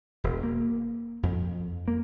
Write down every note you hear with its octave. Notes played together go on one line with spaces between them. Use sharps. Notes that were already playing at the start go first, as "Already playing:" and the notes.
E1
A#3
F2
A#3